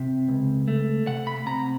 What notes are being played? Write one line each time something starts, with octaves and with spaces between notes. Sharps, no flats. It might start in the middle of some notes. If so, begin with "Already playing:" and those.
Already playing: C3
C#2
A3
C3 F#5
B5
C3 A#5